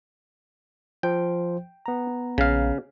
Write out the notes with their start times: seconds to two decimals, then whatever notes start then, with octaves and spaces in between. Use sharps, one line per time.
1.03 F3 C5 G5
1.86 B3 A#5
2.38 A#1 C#3 F5